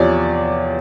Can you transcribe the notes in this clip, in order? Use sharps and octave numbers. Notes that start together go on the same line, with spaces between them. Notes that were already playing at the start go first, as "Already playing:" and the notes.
Already playing: E2 C3 F3 C#5 D5